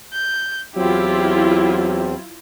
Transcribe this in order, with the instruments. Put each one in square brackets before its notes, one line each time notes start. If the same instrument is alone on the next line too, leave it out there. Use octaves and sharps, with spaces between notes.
[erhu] G6
[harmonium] E2 C4 [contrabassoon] F#3 [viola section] E4 F4 [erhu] G4